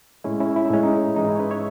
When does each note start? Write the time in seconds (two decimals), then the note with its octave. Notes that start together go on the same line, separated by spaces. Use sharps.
0.24 A2 G#3 C#4 E4
0.40 C#4 E4
0.56 E4
0.65 D#4
0.71 A2 G#3 C#4
0.83 D#4
1.16 G#2 E3 G#3 D#4
1.28 C#4 E4
1.36 C#5
1.40 B4 D#5
1.50 C#5 E5